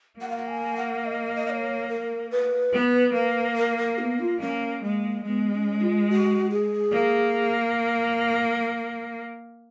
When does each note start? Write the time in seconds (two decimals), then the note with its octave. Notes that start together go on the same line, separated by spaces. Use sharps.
0.21 A#3 F#5
0.29 F5
0.37 F#5
0.48 G#5
0.76 F#5
1.05 D#5
1.35 D#5
1.46 D#5
1.50 C#5
1.89 A#4
2.31 B4
2.73 B3
3.14 A#3
3.57 A#4
3.78 A#4
3.99 B3
4.20 F4
4.40 A#3 C#4
4.83 G#3 A#3
5.25 G#3 B3
5.54 C#4
5.81 F4
6.09 F#4
6.51 G#4
6.93 A#3